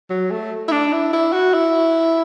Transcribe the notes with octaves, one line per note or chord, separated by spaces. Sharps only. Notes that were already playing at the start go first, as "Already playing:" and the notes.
F#3
A3
E4
D4
E4
E4
F#4
E4